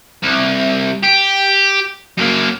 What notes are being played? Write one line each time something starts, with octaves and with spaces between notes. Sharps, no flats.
C2
G4
F#2 A#3